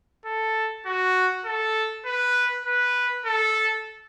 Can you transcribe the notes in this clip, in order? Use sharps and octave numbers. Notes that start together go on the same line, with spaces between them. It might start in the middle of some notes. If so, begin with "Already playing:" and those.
A4
F#4
A4
B4
B4
A4